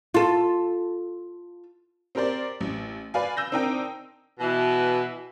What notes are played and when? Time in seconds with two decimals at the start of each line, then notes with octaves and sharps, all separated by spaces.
0.14 F4 A4
2.15 C4 G4 A#4 C5 D5
2.61 A1
3.14 B4 D5 F5 G#5
3.37 E6 G6 A#6
3.52 C4 D4 D#4 A#4 G5
4.39 B2 E3